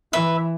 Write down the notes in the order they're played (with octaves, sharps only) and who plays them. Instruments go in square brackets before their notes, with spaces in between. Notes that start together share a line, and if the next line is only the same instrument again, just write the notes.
[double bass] E3 [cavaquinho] B4 E5